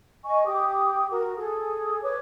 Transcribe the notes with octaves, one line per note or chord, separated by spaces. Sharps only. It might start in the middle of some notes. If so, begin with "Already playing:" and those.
D#5 G#5 C#6
G4 G5 D6 D#6
F#4 A#4
G#4 A4 D#6
B4 C#5 D6